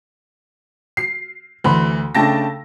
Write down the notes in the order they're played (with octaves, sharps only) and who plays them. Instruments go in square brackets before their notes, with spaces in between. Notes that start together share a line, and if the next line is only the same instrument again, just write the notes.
[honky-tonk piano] C7
[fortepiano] D2 B5 C6 [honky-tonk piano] E3
[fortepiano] C#3 A3 D4 [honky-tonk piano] G5 A5 A#6